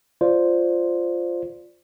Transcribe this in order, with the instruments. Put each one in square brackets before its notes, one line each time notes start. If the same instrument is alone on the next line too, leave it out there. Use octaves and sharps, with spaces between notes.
[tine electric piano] F4 C5 D5